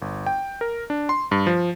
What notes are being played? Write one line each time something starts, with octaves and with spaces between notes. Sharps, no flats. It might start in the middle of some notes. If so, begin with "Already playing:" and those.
G1
G5
A#4
D4
C6
G2
F3